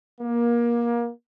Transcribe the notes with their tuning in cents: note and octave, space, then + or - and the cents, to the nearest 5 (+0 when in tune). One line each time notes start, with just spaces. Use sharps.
A#3 +25